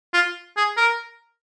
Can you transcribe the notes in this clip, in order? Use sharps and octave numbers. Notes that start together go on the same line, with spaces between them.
F4
G#4
A#4